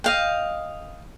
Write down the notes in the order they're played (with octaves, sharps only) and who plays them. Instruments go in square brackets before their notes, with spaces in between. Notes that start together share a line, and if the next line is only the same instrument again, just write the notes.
[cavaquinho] D#5 F5 G5